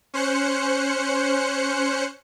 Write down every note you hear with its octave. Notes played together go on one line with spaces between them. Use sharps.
C#4 C5 F#6 C#7